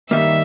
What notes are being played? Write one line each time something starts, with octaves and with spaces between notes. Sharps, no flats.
G2 D#3 G3 A#3 D#4 E5